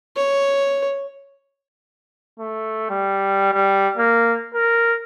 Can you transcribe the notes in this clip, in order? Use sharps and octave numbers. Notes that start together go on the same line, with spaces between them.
C#5
A3
G3
G3
A#3
A#4